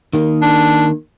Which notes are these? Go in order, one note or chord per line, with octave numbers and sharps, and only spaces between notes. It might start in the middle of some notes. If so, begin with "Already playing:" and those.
D#3 A#3
D4